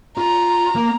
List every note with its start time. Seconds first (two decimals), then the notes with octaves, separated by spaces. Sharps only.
0.18 F4 A#5
0.76 A#3